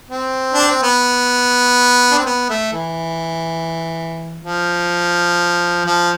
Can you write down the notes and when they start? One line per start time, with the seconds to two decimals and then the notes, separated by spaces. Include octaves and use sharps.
0.10 C4
0.54 D4
0.68 C4
0.82 B3
2.11 D4
2.19 C4
2.26 B3
2.50 A3
2.73 E3
4.41 F3
5.85 F3